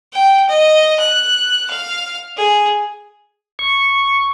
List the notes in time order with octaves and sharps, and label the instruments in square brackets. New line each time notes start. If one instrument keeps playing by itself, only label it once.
[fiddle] G5
D#5
F#6
F5
G#4
[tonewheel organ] C#6